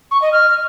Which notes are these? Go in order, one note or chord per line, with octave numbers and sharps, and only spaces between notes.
C#6
D#5
F6